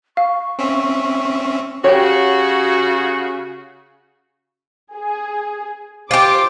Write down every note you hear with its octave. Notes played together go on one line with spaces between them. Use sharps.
F5 C#6
C4 C#4 E5
C#3 F#4 G4 C#5
G#4
F4 G4 C5 D6